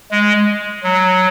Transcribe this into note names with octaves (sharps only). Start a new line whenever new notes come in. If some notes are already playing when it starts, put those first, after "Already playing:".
G#3
F#3